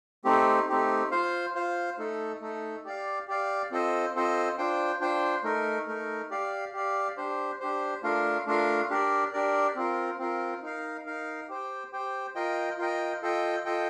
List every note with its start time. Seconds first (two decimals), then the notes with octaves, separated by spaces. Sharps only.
0.25 A3 C4 D#4 G4
0.69 A3 C4 D#4 G4
1.11 F4 C5 F5
1.55 F4 C5 F5
1.98 A3 D#4 A4
2.41 A3 D#4 A4
2.85 G4 D5 F5
3.28 G4 D5 F5
3.71 C4 F4 A4 C5 D#5
4.15 C4 F4 A4 C5 D#5
4.58 D4 F4 C5 G5
5.01 D4 F4 C5 G5
5.43 A3 D#4 A#4
5.87 A3 D#4 A#4
6.30 G4 D5 F5
6.73 G4 D5 F5
7.17 D4 G4 C5
7.60 D4 G4 C5
8.03 A3 D4 F4 A#4 F5
8.47 A3 D4 F4 A#4 F5
8.90 D4 G4 A#4 D5
9.33 D4 G4 A#4 D5
9.75 C4 F4 A#4
10.19 C4 F4 A#4
10.62 D#4 A#4 F5
11.06 D#4 A#4 F5
11.49 G4 C5 G5
11.92 G4 C5 G5
12.35 F4 A#4 D#5 G5
12.78 F4 A#4 D#5 G5
13.22 F4 A4 D#5 G5
13.65 F4 A4 D#5 G5